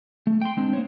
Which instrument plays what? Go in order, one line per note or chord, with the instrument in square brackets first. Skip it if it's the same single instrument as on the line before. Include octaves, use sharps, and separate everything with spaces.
[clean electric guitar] A3
G5 C6
G#3 C4 D4
A#3 C5 C#5